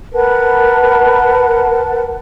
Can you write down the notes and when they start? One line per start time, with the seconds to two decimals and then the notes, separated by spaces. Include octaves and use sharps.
0.13 A#4 B4 F#5 A5